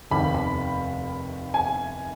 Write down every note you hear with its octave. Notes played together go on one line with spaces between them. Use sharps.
F1 D#2 D#3 B5
B5
G#5